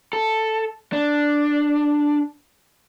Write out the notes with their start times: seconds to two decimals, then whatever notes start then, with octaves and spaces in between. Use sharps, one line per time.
0.13 A4
0.93 D4